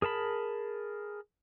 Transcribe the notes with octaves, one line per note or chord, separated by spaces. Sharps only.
G#4 A#4 A5 B5